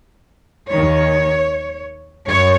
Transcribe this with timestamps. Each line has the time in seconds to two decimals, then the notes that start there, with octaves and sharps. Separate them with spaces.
0.70 D#2 D#3 C#5
2.27 F#2 C#5